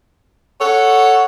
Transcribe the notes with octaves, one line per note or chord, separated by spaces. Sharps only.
A4 C#5 F#5